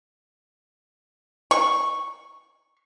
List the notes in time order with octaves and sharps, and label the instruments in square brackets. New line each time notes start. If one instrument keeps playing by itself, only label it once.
[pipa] C#6